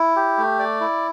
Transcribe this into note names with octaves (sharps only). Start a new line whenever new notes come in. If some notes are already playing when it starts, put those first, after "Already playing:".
Already playing: E4
G4
A3
D5
E4